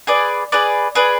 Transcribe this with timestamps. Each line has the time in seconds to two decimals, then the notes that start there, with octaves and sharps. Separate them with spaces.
0.07 G#4 B4 D5
0.52 G#4 B4 D5
0.95 G#4 B4 D5